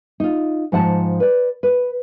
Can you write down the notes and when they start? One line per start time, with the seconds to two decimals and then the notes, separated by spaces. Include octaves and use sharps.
0.20 D#4 F4
0.72 G#2 F3 F#5 A5
1.20 B4 D5
1.63 B4